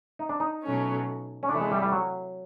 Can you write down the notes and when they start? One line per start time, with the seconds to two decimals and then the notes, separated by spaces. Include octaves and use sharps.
0.19 D#4
0.29 D4
0.40 D#4
0.63 B2 F#3 A3 C#4
1.43 C#4
1.49 C3 E3 A3 D4
1.60 G#3
1.71 G3
1.82 G3
1.92 F#3